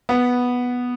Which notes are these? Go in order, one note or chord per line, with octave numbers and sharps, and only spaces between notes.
B3